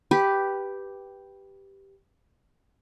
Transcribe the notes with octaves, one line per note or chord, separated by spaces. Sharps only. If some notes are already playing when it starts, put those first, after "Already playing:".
G4 B4